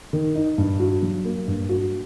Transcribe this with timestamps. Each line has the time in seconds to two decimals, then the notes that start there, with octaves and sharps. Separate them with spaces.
0.13 D#3
0.35 D#4
0.58 G2
0.80 F#4
1.02 F#3
1.25 A#3
1.48 G2
1.69 F#4